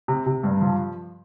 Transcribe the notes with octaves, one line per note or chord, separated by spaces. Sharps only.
C3
C3
G2
F3